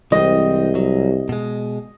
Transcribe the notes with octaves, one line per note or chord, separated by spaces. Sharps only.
C2 E3 G#3 C4 D#5
F#3
B2 G#3